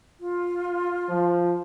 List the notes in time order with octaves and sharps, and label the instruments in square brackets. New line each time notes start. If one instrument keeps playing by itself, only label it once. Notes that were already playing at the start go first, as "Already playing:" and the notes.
[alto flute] F4
[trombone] F3